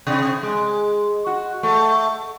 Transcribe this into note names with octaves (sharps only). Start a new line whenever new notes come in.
C3
G#3
F#4
A3